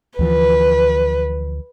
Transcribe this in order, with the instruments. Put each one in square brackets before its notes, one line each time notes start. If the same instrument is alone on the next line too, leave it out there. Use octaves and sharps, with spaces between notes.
[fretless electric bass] D2 E3 F3 [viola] B4